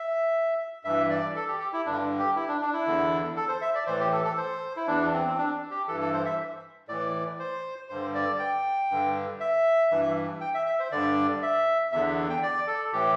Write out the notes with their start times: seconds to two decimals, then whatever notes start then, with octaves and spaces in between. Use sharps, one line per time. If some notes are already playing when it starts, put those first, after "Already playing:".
Already playing: E5
0.84 G2 E3 E5
1.10 D5
1.36 A4
1.48 G4
1.60 G4
1.73 E4
1.86 G2 D3 D4
2.19 G4
2.36 E4
2.48 D4
2.62 D4
2.73 E4
2.87 E2 D3
3.36 A4
3.48 C5
3.62 E5
3.75 D5
3.87 A2 E3 C5
4.00 G4
4.12 A4
4.24 A4
4.38 C5
4.77 E4
4.87 E2 E3 D4
5.13 C4
5.27 C4
5.38 D4
5.71 G4
5.88 G2 E3 A4
6.01 A4
6.13 C5
6.26 E5
6.88 A2 E3 D5
7.39 C5
7.89 G2 D3 C5
8.14 D5
8.39 G5
8.91 G2 D3
9.40 E5
9.91 G2 E3
10.41 G5
10.54 E5
10.66 E5
10.80 C5
10.91 G2 D3 D5
11.42 E5
11.92 E2 D3 E5
12.30 G5
12.43 D5
12.67 A4
12.93 A2 E3 G4